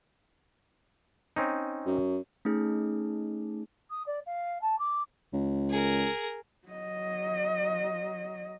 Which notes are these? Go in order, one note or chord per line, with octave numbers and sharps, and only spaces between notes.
C4 C#4 D#4
F#2
A3 C#4 D#4 G#4
D#6
D5
F5
A5
D6
C#2
G#4 A#4
F#3 D#5